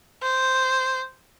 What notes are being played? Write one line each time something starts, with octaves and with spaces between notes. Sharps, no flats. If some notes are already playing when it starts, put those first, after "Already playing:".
C5